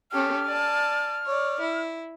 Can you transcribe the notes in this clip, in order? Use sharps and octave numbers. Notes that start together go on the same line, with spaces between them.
C#4 G4 A4 F6
D5 G#5 A5
C#5 D5
E4